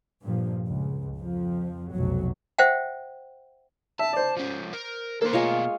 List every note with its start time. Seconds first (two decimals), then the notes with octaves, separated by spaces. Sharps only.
0.22 G2 A#2 F3
0.68 C#2
1.17 F2 F3
1.91 F1 B1 F#3
2.58 C5 E5 F#5 G5
3.99 E5 A5
4.13 C5 D5
4.37 F3 C#4
4.73 A#4
5.22 A#3 A4 C5
5.33 B2 G#3 F4 A#4 C#5